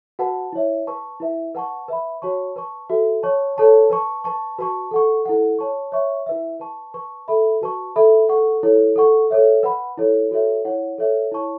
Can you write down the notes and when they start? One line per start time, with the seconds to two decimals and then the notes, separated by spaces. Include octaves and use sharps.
0.19 F#4 B4 F#5 A5
0.53 E4 C#5 E5
0.87 B4 A5 C#6
1.20 E4 B4 E5
1.55 B4 F#5 A5 C#6
1.88 B4 E5 B5
2.22 F#4 C#5 A5 C#6
2.56 B4 A5 C#6
2.89 F#4 A4 E5
3.23 C#5 A5 C#6
3.57 A4 C#5 A5 C#6
3.90 B4 A5 C#6
4.24 B4 A5 C#6
4.58 F#4 B4 A5 C#6
4.91 A4 F#5 C#6
5.25 E4 A4 F#5
5.59 C#5 A5 C#6
5.92 C#5 E5 C#6
6.26 E4 B4 E5
6.60 B4 A5 C#6
6.94 B4 A5 C#6
7.28 A4 E5 B5
7.61 F#4 B4 A5 C#6
7.96 A4 E5 B5
8.29 A4 F#5 C#6
8.63 E4 A4 C#5
8.96 A4 F#5 C#6
9.30 A4 C#5 E5
9.63 B4 F#5 B5
9.98 E4 A4 C#5
10.31 F#4 A4 C#5 E5
10.65 E4 C#5 F#5
10.98 A4 C#5 E5
11.32 E4 C#5 A5 C#6